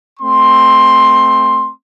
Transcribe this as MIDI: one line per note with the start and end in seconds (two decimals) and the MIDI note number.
0.20 1.70 57
0.20 1.70 60
0.20 1.70 84